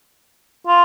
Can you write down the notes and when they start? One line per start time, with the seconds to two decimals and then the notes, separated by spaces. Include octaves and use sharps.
0.67 F4